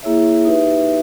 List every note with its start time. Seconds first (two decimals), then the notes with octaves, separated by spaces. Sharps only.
0.02 A#3 E4 G#4 C#5 E5
0.45 D#4 G4 B4 E5